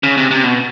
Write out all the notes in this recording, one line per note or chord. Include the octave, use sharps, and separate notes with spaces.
C#3
C3
C3
B2